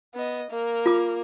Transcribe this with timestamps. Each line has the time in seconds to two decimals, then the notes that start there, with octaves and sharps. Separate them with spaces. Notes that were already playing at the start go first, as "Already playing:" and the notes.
0.15 B3 D#5
0.51 A#3 A#4
0.86 F4 D6